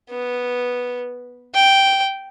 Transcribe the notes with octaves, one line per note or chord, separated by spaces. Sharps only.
B3
G5